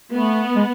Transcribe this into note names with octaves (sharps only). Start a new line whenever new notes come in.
A3 B3
G#3